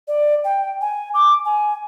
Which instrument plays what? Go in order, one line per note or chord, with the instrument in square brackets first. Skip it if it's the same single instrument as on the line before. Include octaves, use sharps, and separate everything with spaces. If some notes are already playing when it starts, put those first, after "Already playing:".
[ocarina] D5
G5
G#5
D6
G#5